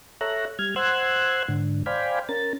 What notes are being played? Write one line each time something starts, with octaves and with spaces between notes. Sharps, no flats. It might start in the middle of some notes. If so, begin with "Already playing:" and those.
A4 C#5 E5 A#5 F#6
G3 F6 G#6
C5 F#5 C6 E6 F#6 G#6
G#2 D3
C5 D5 F5 G5 G#5 B5
C#4 A#4 A6